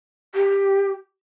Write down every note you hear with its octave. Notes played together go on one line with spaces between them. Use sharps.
G4